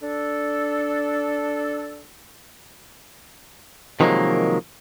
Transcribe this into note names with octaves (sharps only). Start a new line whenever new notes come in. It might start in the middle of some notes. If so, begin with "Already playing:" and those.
D4 A4
C3 D#3 F3 F#3 G#3 A#3